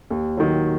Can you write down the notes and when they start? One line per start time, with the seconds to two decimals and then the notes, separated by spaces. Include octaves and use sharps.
0.11 D#2
0.37 D#3 F#3